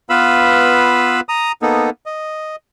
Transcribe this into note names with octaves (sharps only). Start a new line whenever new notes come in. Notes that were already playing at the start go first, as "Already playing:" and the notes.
B3 F4 B4 F5 B5 E6
A#5 D#6
A#3 B3 D#4 A4
D#5